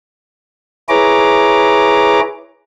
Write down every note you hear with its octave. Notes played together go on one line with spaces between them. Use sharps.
E4 G#4 B4 C#5 A#5 D6